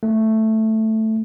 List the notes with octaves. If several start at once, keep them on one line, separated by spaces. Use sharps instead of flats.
A3